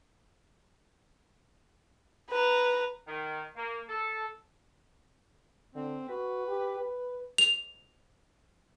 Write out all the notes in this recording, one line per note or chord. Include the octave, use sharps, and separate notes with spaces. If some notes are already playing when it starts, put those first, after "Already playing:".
B4 A#5
D#3
A#3
A4
D3 C4
F#4 B4
G4
B4
F7